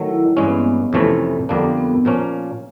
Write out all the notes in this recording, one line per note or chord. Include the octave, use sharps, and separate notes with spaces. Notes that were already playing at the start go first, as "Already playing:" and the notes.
Already playing: D#3 F#3 A3
E4
G2 E3 G#3 C4 C#4
B3
A#3
B3
F2 C3 E3 A3 C#4
F2 D3 G3 A#3 B3 D4
B3
A#2 F3 A#3 C#4